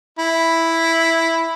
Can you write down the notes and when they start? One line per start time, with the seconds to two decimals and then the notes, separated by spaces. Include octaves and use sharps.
0.19 E4